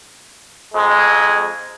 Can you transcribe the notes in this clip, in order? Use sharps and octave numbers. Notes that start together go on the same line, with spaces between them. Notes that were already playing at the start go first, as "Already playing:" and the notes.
F2 G#3